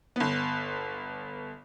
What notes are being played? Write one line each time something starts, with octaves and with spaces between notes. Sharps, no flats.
G1 B3